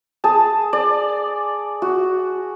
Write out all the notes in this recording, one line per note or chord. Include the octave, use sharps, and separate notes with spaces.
G#4 A5
D5
F#4